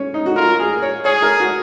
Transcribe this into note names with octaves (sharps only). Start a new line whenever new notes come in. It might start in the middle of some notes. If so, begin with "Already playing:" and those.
Already playing: C#4
D#4
F#4
F4 A#4
G#4
C#5
G#4 C#5
A#4
F#4